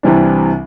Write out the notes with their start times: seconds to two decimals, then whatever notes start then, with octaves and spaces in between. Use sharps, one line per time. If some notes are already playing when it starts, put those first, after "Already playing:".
0.03 C2 C3 E3 G3 D4